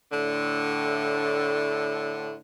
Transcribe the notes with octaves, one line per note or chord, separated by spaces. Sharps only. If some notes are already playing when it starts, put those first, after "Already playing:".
A2 D3